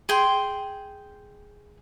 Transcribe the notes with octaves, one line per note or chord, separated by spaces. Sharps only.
G#4 G5 C6